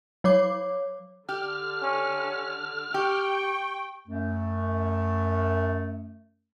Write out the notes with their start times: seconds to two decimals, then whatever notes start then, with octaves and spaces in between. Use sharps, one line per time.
0.24 F#3 C#5 D6
1.29 D3 G4 F6
1.80 C#4
2.94 G4 G5 C#6
4.08 F#2 A3